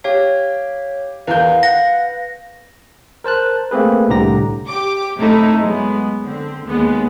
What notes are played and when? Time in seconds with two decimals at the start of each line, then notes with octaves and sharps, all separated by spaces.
0.04 G4 C#5 F5
1.27 E2 A#4 B4 F5 G6
1.63 F#5 A#6
3.24 A#4 C5 A5 F#6
3.71 A3 A#3 C4 G#4 B4
4.08 C2 A2 D3 G4 A#5 A#6
4.68 G4 D6
5.18 F#2 C3 A3 D#4 E4
5.60 F#3 G#3 B3
6.22 D3 C4
6.65 D#2 G#3 B3